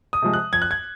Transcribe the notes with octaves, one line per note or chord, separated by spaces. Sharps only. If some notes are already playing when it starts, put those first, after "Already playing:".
D#6
C3 F3 G#3
F#6
F2 G#6
F#6
G#6